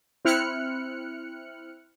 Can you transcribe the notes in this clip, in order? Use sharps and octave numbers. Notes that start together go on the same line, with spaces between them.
C4 E4 F6 F#6 C#7